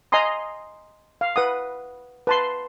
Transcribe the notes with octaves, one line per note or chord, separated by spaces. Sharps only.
D#5 G#5 A#5 C6 D#6
F5
B4 F#5 D#6
B4 A5 C6